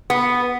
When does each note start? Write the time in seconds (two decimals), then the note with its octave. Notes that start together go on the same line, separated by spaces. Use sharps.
0.10 B3